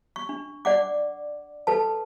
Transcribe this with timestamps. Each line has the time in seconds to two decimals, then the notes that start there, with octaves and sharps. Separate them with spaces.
0.16 C#6
0.29 D4
0.65 D5 F#5 D6
1.67 A4 B4 A5